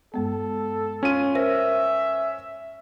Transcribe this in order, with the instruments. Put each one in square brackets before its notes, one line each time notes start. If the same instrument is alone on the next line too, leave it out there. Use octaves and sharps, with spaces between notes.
[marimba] G2 G#3 B3 [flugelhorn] A4
[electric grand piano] C#4 D#7 [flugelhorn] F4
[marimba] A#4 C5 A#6 [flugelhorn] E5